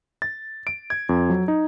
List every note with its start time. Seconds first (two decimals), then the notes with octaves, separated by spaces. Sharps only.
0.22 A6
0.67 D7
0.90 G#6
1.09 F2
1.30 F#3
1.48 D#4